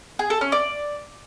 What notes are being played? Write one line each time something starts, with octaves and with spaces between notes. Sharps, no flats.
G#4
A4
C#4
D5